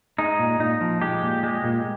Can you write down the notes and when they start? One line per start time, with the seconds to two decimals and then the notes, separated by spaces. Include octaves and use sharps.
0.18 G#3 D#4
0.39 A#2
0.60 A#2 D#4
0.81 F3
1.01 G#3 G4
1.22 A#2
1.43 G#3
1.64 A#2